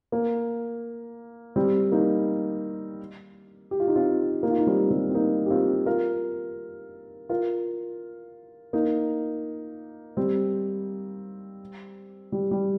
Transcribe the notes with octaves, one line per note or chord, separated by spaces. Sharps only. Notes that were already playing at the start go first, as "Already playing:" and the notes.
A#3
G3 C4
A#3 D#4
G4
F4
D#4
C4 F4
A#3 D#4
F4
D#4
G3 C4
G3 C4
C4
A#3 D#4
G4
C4 F4
F4 A#4
F4 A#4
A#3 D#4
G3 C4
G3
G3